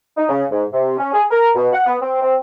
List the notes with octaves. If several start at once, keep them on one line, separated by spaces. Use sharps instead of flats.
D#4
C#3
G#2
C3
C#4
G#4
A#4
B2
F#5
B3
C4
C4